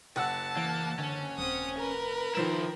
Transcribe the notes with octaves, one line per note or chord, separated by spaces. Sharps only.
F#1 F#5 A5 E6
E3 A#3
D3 C#4
D#1 C4 D#6
A#4 B4
D#3 F3 E4 C5 E7